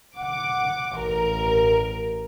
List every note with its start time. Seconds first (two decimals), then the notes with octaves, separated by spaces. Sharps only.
0.16 F#5 D6
0.98 A1 A#4